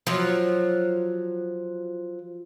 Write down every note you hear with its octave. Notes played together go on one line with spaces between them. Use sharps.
F3 F#3